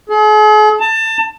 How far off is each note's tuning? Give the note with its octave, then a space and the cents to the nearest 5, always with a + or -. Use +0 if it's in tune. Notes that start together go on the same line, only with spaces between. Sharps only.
G#4 +45
A5 +25